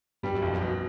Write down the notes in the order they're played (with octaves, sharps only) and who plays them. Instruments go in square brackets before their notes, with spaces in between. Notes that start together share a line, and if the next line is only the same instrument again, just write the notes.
[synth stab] G2 [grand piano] G3
[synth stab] F#2
[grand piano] B1 [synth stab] F2
[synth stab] F#2
[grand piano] B2